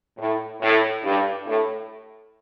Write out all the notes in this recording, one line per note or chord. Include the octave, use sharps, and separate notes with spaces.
A2
A2
G2
A2